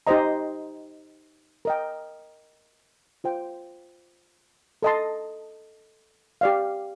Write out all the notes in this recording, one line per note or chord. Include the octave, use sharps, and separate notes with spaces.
D#4 G4 C5 D#5 A#5
A#4 D#5 G5
F4 C5 G5
A4 D#5 A5 C6
G4 D5 F5